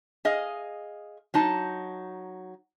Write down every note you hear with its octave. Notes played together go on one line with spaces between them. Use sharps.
G#4 D#5 F5
F#3 D#4 A5